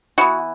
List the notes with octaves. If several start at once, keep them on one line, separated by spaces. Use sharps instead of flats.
E3 B3 F#4